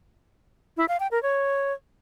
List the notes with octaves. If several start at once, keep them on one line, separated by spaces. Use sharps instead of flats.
E4
F5
G5
A#4
C#5